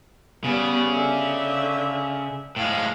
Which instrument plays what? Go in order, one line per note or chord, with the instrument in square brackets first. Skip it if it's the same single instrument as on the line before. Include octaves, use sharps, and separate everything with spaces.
[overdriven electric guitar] C#3 [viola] G3 B3
[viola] D3 E5
[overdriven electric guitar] A2 G#3 [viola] F5